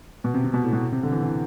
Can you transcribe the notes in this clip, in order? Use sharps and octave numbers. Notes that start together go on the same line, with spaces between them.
B2
C3
C3
B2
A2
B2
C3
D3
E3
E3